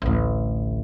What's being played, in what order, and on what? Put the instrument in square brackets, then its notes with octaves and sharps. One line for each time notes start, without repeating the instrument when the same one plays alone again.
[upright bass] A1 D2